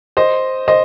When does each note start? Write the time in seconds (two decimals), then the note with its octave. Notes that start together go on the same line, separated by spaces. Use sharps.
0.17 C5 D#5
0.68 C5 D#5